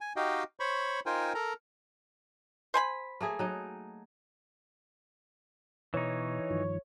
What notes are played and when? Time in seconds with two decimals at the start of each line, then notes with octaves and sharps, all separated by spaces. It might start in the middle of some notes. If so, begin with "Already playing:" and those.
0.01 G#5
0.16 D#4 F#4 G4 D#5 F5 G5
0.60 C5 C#5 B5 C#6
1.06 D#4 F4 A#4 C5 G5 G#5
1.35 A4 A#4 A#5
2.74 C5 G#5 B5
3.21 A3 A#3 G#4
3.39 F#3 D#4
5.94 B2 E3 D#4 C#5
6.50 G2 D#3 F3